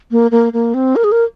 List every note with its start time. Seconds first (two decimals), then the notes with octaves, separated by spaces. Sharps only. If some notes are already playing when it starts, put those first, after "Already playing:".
0.11 A#3
0.31 A#3
0.53 A#3
0.74 C4
0.96 A#4
1.04 G#4
1.12 A#4